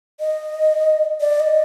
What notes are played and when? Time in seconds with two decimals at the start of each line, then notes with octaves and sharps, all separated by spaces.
0.20 D#5
1.21 D5
1.40 D#5